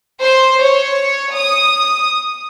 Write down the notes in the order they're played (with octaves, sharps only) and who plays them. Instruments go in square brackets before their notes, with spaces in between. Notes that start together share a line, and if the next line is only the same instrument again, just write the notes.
[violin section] C5
C#5
D#6